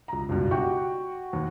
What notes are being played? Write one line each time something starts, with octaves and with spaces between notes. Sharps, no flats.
C#2 A#5
C#2 G2 B2
F#4 G4 G5
D#2